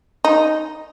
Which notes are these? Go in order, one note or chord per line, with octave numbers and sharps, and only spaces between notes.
D#4